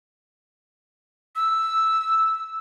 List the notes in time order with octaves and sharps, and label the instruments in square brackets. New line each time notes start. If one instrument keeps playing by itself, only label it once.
[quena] E6